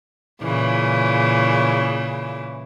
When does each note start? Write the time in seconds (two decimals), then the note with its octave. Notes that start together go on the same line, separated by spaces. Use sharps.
0.42 A#2 C#3 E3